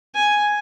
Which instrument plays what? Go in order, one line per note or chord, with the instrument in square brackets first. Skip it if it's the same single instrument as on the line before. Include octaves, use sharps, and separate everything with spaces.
[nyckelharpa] G#5